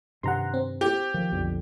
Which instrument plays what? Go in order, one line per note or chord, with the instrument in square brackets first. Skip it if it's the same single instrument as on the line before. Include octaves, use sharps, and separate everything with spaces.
[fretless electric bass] G2 C3 D#3 [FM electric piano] F#5 A#5 C6
[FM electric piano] C4
[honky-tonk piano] G4
[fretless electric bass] D#3 F3
B1 F2 D3